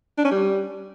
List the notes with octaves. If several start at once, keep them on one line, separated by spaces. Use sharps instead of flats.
D4
C#4
G3